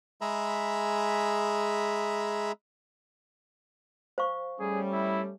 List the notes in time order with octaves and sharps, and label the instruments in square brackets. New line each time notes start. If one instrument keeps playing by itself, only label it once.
[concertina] G#3 G#4 E5 A#5 B5
[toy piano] C5 F5 C#6
[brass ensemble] G3 [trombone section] A3 C#4 [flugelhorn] G#4
[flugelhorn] E4